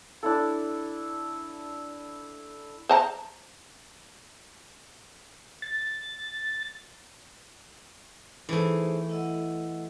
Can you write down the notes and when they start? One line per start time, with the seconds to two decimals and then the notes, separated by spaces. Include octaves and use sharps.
0.23 D4 E4 A4
2.89 C5 A5 A#5
5.62 A6
8.49 E3 A3 D#4 G#4 C5
9.09 E4 D#5 F#5